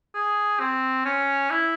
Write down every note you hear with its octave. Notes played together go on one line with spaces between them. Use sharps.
G#4
C4
C#4
E4